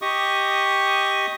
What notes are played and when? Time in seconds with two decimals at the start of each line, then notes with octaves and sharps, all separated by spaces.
0.02 G4 D#5 C#6 D#6